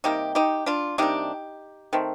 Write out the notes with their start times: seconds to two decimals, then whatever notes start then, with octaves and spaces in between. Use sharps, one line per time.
0.04 C3 G3 A#3 D#4 G4
0.35 D#4 G4
0.66 D4 F4
0.98 C3 G3 A#3 D4 D#4 G4
1.93 D#3 A3 C4